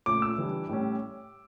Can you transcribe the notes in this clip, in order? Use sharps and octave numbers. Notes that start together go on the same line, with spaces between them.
A#2 A3 C#4 D6
E6
E3 G3 D4
A2 G3 C#4